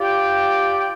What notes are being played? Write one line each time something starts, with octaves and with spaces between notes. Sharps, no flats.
F4 G4 D5 G5